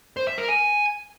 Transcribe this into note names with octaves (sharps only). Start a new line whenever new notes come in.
C5
E5
A#4
G#5